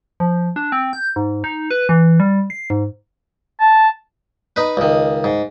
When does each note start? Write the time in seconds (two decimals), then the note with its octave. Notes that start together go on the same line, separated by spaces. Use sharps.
0.20 F3
0.56 D4
0.72 C4
0.93 G6
1.16 G#2
1.44 D#4
1.71 B4
1.89 E3
2.20 G3
2.50 C7
2.70 G#2
3.60 A5
4.56 D#4 B4
4.77 C#2 D#3
5.24 G#2